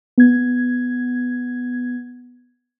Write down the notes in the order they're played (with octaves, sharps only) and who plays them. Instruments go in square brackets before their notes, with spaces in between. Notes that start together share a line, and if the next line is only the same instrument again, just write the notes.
[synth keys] B3 G#6